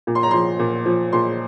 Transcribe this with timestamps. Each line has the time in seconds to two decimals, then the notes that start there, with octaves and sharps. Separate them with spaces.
0.07 A#2
0.15 C6
0.23 A#5
0.31 F3 C6
0.59 A#2
0.86 F3
1.12 A#2 C6